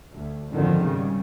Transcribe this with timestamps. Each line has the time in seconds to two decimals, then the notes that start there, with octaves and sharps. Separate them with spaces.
0.12 D2
0.50 G#1 F#2 D3 D#3 F3
0.83 G#2 C#3 G3